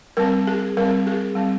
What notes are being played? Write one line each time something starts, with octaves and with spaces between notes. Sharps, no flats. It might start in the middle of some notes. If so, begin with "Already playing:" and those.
G3 C4 A#4
G#4
G3 C4 A#4
G#4
G3 C4